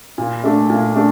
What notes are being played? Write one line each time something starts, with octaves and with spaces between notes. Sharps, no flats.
A#2
A3 D4
A#2
A3 D4